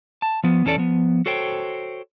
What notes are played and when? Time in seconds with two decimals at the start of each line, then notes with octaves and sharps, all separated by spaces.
0.22 A5
0.44 F3 B3
0.65 E2 E3 C#4 A4 D5
0.78 F3 B3
1.26 F#4 A4 C5 C#5 G5